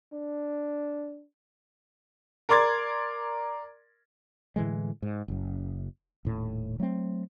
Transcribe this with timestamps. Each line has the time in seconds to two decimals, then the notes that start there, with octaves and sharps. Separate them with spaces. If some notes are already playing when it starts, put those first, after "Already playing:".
0.13 D4
2.49 A#4 D5 C6 D6 G#6 A6
4.56 A2 D3 E3 G#3
5.02 G#2
5.28 F#1 F#2
6.25 D#1 A2
6.80 F#3 A3 C4